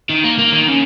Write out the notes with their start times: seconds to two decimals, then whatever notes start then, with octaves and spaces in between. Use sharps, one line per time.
0.09 D#3
0.24 A#3
0.39 A#3
0.53 D#3
0.69 C#3